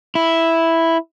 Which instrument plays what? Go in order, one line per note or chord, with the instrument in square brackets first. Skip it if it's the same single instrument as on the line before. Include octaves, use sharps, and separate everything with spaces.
[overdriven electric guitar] E4